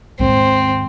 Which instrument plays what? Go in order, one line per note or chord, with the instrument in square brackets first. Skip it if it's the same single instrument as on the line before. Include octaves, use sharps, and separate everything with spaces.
[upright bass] D#2 G#2 [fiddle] C4